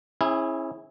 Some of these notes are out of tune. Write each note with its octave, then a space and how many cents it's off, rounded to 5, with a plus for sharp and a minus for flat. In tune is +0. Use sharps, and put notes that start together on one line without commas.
C#4 -40 E4 -15 G#4 +0